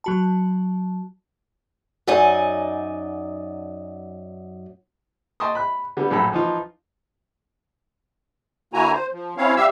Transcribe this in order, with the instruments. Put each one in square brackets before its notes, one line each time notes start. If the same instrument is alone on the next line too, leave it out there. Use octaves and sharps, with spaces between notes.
[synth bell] F#3 F#4 A5
[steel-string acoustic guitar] F#2 F#3 D#4 D5 D#5 G#5
[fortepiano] D#5 G5 A5 C6 C#6 D#6
B5 F#6
D3 G3 B3
A#1 F#2 A2 A4 B5
E3 F3 D#4 F4
[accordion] D3 A#3 E4 F#4 G#5 A#5
C5
F3
C4 C#4 E4 C#5 F5
G3 G4 E5 F5 E6